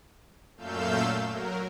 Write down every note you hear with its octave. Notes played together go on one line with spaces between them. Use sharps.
F#2 A#2 A3 F5 E6 G6
F#3 A#4